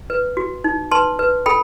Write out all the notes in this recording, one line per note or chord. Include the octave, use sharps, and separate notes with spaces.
B4
F#4
D#4
B4 A5 C6
B4
A4 G5 B5